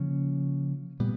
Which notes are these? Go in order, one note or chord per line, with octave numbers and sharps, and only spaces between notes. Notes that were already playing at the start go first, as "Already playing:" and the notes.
Already playing: C#3 F3 A#3 C#4
A#2 G3 B3